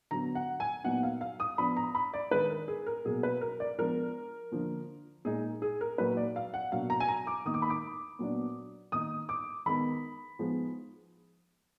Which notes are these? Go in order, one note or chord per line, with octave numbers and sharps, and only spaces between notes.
D3 F#3 B3 A#5
F#5
G#5
A#2 F#3 B3 D#4 F#5
F5
F5
D#6
F3 B3 D4 B5
A#5
B5
D5
D#3 G#3 D4 B4
A#4
G#4
A#4
B2 F#3 A#3 G#4
B4
A#4
D5
F3 G#3 B3 D4 A#4
D3 F3 A#3
A#2 G#3 D#4 G#4
G#4
A#4
A#2 F#3 A#3 D#4 B4
D5
F5
F#5
B2 F#3 A#3 D4 F5
A#5
G#5
A#5
D6
D#3 A#3 D#4 D#6
D6
B5
D6
A#2 F#3 B3 D4
D#3 A#3 D#4 D#6
D6
D#3 G#3 B3 D#4 B5
F3 G#3 B3 D#4